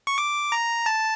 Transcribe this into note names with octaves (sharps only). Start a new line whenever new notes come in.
C#6
D6
A#5
A5